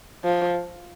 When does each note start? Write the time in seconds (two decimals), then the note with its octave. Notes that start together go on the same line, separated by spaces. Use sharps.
0.24 F3